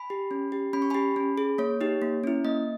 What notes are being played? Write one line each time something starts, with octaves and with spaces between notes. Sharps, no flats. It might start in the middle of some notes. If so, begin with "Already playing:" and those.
Already playing: G#5 B5
G4
C#4
G4
C#4 B5
C#6
G4 G#5 B5
C#4
G#4
A#3 C#5
D#4 G4
A#3
C#4 E4
A#3 D#5